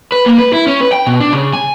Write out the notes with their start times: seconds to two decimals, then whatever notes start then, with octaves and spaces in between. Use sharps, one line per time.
0.12 B4
0.26 A#3
0.38 B4
0.53 E4
0.67 C#4
0.81 B4
0.92 G5
1.07 B2
1.20 D4
1.33 C#3
1.53 G#5